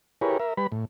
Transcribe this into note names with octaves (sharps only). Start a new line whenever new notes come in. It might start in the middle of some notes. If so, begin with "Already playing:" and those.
E4 G4 G#4 A#4 B4 C#5
A#4 E5
G3 B4 B5
A2